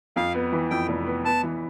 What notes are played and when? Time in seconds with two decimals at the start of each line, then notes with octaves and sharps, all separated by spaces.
0.16 F2 F5
0.34 B3
0.52 E3
0.70 F2 G5
0.89 F1
1.06 B3
1.25 B3 A5
1.43 E3